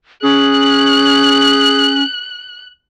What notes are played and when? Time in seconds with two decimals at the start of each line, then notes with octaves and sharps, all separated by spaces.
0.23 C#4 G#4 F#6